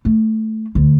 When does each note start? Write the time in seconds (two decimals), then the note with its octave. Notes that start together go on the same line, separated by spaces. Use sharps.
0.05 A3
0.75 D2